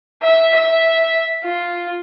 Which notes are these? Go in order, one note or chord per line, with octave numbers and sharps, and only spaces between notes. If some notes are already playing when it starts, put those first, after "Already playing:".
E5
E5
F4